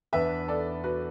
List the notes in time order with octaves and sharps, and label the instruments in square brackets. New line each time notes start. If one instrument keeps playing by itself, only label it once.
[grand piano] E2 E3 D4 [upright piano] B4 E5
[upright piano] A4 D5
F#4 B4